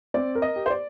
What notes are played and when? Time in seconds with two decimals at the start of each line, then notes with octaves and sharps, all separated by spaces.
0.14 C4 D5
0.35 A#4
0.42 D#5
0.56 G4
0.66 C5
0.70 D5